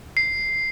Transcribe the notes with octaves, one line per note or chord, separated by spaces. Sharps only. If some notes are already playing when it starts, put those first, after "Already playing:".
C7